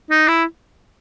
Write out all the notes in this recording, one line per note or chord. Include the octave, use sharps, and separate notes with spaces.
D#4
E4